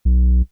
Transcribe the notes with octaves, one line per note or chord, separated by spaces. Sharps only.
B1